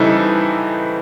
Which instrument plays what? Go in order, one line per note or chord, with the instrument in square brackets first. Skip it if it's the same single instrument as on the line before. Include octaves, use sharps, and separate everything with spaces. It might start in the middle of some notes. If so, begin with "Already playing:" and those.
Already playing: [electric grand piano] C#3 E3 G3 D#4 E4 A4 B4 C5